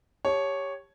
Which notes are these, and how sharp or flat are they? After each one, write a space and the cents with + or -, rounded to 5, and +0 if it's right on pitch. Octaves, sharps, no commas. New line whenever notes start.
G4 +15 C#5 +0 A5 -20